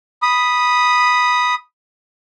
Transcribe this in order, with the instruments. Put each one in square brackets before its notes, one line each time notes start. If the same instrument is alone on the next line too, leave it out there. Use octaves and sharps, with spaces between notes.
[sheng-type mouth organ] B5 D#6